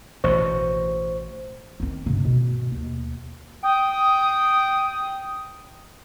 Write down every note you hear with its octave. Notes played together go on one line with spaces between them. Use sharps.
A1 B2 C5 C#6
D#3 C4
G2 C#3
B2
D#2
G5 D#6